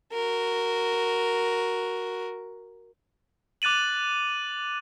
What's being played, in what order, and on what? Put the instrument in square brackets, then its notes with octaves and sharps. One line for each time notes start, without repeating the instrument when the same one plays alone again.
[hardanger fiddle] F#4 A#4
[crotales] D6 F#6 A6 D#7 F#7